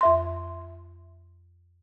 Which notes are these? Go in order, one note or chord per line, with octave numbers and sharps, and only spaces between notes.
F2 E5 C6